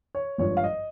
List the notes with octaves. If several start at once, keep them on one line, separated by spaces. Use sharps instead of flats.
C#5
G#1 G2 F3 C#5
F5
D#5